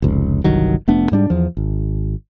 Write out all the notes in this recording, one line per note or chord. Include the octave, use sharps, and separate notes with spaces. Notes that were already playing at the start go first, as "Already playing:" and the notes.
F1 C#2
G1 C2 D#3 F#3
F1 A3 B3 D4
G#2 G3 D4
E2 F3
G#1